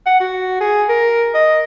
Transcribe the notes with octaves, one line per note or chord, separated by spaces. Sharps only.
F#5
F#4
G#4
A#4
D#5